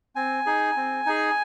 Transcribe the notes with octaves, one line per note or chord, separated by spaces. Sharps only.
C4 G#5
D#4 G#4
C4
D#4 G#4